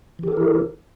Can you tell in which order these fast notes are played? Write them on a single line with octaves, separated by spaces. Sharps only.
E3 G4 A4 A#4 E4